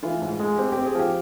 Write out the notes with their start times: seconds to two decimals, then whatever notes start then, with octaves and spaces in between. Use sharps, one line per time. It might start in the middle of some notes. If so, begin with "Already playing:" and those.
0.03 E3 F4
0.22 G#2
0.39 G#3
0.58 C4 G4
0.72 C4 G4
0.86 G#4
0.95 F3 G4